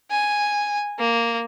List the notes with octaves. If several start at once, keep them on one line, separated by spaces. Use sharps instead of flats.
G#5
A#3